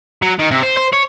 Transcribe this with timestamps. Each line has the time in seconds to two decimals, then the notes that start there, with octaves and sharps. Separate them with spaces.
0.22 F#3
0.39 D#3
0.51 C3
0.63 C5
0.77 C5
0.93 C#5